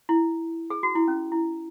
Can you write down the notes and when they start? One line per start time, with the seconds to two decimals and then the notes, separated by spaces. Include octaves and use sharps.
0.09 E4
0.70 G#4
0.83 F#4
0.95 E4
1.08 C#4
1.32 E4